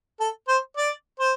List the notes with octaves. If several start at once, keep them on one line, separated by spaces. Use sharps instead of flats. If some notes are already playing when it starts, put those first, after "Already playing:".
A4
C5
D5
C5